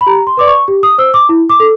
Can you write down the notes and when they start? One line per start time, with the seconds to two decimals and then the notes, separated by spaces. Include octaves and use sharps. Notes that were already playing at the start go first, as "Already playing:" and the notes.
0.01 B5
0.06 G4 A#5
0.27 C6
0.37 B4 D5 D6
0.47 C#6
0.68 G4
0.83 D#6
0.98 C5 E6
1.14 D6
1.29 E4
1.49 D6
1.60 A4